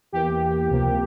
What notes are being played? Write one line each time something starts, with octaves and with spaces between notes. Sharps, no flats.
E2 E3 A#3 G4
C#2 C3 F3 A#3